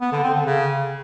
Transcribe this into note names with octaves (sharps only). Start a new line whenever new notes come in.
B3
D3
C4
D3
C#3